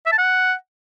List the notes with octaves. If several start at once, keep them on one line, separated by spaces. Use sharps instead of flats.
E5
A5
F#5